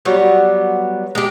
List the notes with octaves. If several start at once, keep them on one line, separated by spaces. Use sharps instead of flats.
F#3 G3 B3
G#3 G4